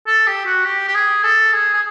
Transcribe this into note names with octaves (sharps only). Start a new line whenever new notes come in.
A4
G4
F#4
G4
G4
G#4
A4
G#4
G#4